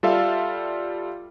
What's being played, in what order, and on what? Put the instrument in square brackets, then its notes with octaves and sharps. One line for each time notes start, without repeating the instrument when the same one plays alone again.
[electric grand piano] G3 F4 A4 E5 F5